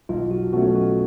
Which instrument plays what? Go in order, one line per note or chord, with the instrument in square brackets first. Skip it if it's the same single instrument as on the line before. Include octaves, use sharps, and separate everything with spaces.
[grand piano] B1 [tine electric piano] F4
[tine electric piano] F#4
[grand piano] B2 F#3 A3 C#4 [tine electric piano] F#4
[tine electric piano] F#4